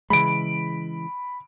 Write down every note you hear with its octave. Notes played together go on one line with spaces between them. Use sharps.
C#3 E3 G#3 B5 D7